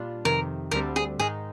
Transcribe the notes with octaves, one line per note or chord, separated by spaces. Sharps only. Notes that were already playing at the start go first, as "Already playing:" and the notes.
Already playing: A#2 G3 D4 F4
F2 C3 D#3 A#4
D2 D3 G3 C4 A#4
G#4
G#2 D#3 G#3 D#4 G#4